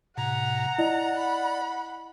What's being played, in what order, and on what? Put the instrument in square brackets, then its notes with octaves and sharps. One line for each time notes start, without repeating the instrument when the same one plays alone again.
[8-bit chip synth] A2 C3 [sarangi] F#5 [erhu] A#5
[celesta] E4 D#5 [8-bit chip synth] D5
[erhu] B5